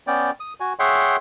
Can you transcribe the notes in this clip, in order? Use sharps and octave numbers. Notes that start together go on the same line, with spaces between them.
B3 C#4 D5 G5
D#6
F#4 G#5
G#4 C#5 E5 F#5 G5 C6